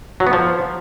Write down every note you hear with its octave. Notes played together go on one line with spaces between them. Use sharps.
F#3
B3
F3